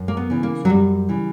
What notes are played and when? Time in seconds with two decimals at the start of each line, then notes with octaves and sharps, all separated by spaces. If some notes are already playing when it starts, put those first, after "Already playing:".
Already playing: F#2
0.08 A#3
0.17 B3
0.30 C#3 E3
0.43 A#3
0.65 F#3
0.69 F#2 G3
1.09 C#3 E3